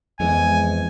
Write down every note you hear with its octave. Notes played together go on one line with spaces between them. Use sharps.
F2 E3 G#3 B3 G#5